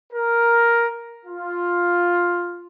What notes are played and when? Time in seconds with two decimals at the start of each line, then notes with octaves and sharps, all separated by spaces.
0.12 A#4
1.25 F4